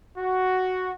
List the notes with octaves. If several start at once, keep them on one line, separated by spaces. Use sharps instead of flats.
F#4